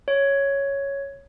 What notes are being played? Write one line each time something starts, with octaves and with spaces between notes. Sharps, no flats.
C#5